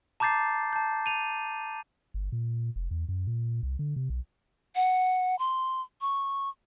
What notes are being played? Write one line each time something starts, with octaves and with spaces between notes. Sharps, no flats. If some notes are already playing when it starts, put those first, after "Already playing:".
A5 A#5 D6 G6 A6 C7
A5 G6
D#7 F7
G1
A#2
F1
E2
F#2
A#2
C2
D3
C3
B1
F#5
C6
C#6